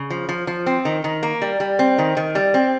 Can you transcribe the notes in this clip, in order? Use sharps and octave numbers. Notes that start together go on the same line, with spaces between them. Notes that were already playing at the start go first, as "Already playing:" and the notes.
Already playing: C#3
F3
F3
F3
C4
D#3
D#3
A#3
G3
G3
C4
D#3
D#3
G3
C4